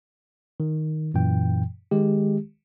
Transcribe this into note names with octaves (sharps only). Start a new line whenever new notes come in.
D#3
F#2 A#2 E3 G5
D#3 G#3 G4